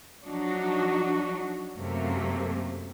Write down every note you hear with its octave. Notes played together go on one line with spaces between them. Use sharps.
F3 F#3 D4 D#4 F#4
F#2 C3 A3 A#3